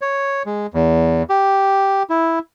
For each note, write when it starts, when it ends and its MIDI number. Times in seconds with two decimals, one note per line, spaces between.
0.01 0.43 73
0.46 0.67 56
0.74 1.23 40
1.30 2.03 67
2.10 2.39 64